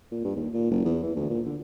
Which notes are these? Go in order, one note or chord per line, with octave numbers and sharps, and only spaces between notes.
A#2
G2
D#2
A#2
F#1
E2
E3
D2
A#2
D3